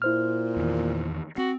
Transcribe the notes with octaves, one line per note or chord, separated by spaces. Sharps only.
A#2 E4 C5 F6
E2 D#3
C4 F#4